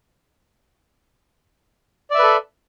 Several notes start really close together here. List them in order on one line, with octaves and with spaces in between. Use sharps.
D5 E5 B4 A4